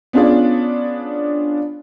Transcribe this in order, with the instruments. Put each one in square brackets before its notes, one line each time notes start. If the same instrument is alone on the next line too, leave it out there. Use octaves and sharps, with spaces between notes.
[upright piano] B3 C#4 D4 F4 G#4 D5